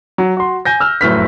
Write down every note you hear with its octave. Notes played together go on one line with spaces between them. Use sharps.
F#3
F#4 C6
G#5 G6 A#6
E6 F6
F1 F#2 A2 B4 F6 B6